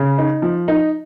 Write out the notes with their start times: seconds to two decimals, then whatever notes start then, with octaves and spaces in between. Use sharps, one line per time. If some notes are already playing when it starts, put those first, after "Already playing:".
Already playing: C#3
0.18 D#4
0.42 F3
0.68 D#4